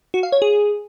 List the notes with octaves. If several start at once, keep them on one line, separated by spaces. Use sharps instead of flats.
F#4
F5
C#5
G#4